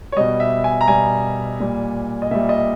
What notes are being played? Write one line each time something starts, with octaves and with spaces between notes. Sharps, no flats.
C#5
B2 G3 D#5
E5
G#5
A#5
B2 G3 G#5
A#2 G3
D#5
A#2 G3 E5
D#5